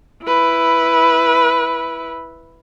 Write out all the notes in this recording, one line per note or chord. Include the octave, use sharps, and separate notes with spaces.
E4 B4